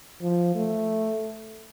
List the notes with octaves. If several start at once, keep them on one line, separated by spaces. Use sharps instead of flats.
F3
A3